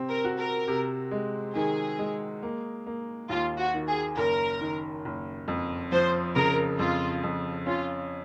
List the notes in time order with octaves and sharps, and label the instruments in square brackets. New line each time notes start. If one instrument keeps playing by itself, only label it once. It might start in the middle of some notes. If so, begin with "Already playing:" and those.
Already playing: [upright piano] C3 C4
[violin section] A#4
[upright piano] F#4
[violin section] A#4
[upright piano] C3
G#3
[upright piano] D#3 [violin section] G#4
[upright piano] G#3
A#3
A#3
[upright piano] D#2 [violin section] F4
[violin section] F#4
[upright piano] D#3
[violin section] G#4
[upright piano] F#1 [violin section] A#4
[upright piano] D#3
F#1
F2
[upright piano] F3 [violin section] C5
[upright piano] C#3 [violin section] A#4
[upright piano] F2 [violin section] F4
[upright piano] F2
[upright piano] C#4 [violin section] F4